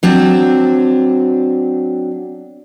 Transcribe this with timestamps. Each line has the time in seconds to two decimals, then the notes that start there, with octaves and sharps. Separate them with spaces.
0.03 F#3 C4 D4